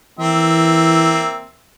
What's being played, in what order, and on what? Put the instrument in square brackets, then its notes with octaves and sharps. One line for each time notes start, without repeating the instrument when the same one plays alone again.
[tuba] E3 [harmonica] A#3 C4 E5